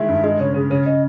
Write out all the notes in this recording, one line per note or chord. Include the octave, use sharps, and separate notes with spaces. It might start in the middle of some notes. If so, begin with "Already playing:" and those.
Already playing: D#3 G#3 E4 E5
G2
G#3 D#5
C#3 C#5
C#3 G#4
C#3 C#5
C#3 D#5